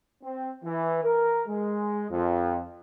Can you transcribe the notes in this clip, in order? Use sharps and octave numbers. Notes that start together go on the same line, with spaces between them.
C4
E3
A#4
G#3
F2